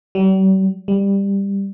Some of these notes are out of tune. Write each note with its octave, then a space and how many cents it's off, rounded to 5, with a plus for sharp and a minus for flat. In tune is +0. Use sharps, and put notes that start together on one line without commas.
G3 -45
G3 +15